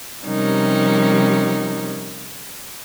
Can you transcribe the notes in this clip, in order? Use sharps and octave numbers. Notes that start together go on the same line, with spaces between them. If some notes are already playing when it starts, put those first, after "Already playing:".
C3 F3 G3 C#4 D#4 A#4